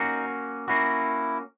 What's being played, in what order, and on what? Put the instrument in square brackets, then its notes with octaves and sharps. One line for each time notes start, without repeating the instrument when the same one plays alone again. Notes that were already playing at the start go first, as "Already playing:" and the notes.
Already playing: [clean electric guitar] A#3 C#4 F#4 [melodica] D#4
[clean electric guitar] A#3 C#4 F#4 [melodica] E4